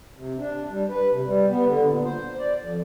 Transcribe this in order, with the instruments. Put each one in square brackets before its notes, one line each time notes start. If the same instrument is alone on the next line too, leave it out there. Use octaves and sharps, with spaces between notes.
[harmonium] C3
D4
G3
B4
C3
G3
B3
D3
A#2
C5
D5
F2